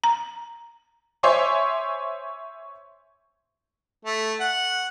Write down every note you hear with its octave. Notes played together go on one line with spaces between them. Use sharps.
A#5
C5 C#5 E5 G#5 C6 D6
A3
F#5